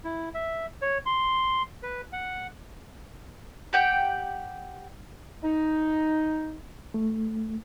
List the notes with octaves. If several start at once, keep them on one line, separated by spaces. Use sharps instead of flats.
E4
E5
C#5
C6
B4
F#5
G4 F#5 G5
D#4
A3